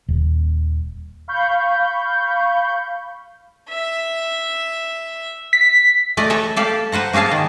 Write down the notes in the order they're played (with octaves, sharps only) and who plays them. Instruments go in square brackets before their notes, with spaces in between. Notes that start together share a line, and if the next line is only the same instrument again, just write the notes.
[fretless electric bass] D#1
[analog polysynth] F5 B5 C#6 G6
[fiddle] E5
[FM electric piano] B6
[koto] A3 D5 D#5
A4 B4 C#5 E5
G4 A4 D5 F5
B4 C5 F#5 A#5
A#3 C#4 G#4 F5 A5
D#3